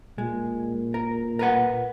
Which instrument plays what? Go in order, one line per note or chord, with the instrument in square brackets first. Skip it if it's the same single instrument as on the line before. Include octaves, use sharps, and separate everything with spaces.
[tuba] A#2 [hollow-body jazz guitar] G#3
[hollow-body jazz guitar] A#4
A#4 B4 F#5